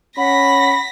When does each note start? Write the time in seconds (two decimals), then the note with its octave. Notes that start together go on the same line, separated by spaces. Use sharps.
0.18 C#4 F#5 B5 A#6 B6